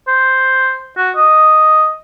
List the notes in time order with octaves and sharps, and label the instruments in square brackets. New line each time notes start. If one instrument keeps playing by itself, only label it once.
[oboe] C5
F#4
D#5